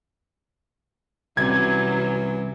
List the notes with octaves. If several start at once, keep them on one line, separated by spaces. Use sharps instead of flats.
C2 C3 E3 F#3 C#4 G#6